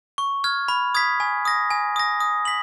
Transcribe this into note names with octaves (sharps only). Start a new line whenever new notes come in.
C#6
F6 G#6
B5
D#6 G#6 B6
G#5
D#6 A#6
G#5
D#6 A#6
D#6
B6 F#7